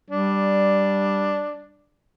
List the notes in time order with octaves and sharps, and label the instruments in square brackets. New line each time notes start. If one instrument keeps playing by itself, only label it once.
[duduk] G3 [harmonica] D4